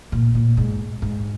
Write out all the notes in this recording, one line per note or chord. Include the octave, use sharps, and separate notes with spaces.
A#2
A#2
G#2
G#2